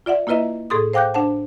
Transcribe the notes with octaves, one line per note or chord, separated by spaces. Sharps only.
F4 D5 E5 F#5
A#3 E4 F4 B4 D#5 E5
A2 G#4 A4 C6 D#6
C5 F5 G5 D6 F#6 G6
D4 C5 F#5 A5